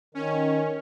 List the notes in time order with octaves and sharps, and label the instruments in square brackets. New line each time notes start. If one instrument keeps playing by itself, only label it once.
[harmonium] D#3 [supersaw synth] C#4